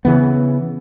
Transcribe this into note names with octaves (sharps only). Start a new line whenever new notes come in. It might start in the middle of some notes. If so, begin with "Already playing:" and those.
C#3 E3 B3